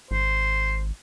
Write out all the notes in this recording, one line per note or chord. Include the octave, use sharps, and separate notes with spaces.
G#1 C5